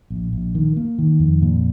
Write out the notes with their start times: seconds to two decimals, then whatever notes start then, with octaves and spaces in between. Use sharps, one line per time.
0.10 A#1
0.33 A#1
0.55 D#3
0.77 A#3
0.99 D#3
1.20 F2
1.42 A#2